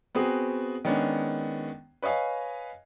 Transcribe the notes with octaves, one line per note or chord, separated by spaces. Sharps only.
B3 C4 F#4 G#4
D#3 G#3 B3 C#4 D4
B4 C#5 D#5 F5 G#5